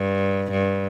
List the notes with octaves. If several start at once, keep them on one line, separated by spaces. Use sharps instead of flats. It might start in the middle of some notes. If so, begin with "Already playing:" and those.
Already playing: G2
G2